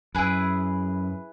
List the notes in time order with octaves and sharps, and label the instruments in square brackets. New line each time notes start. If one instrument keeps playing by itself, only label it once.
[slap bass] F#2 [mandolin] E4 G#4 B4